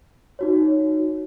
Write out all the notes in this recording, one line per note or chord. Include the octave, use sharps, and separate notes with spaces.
D#4 F#4 C#5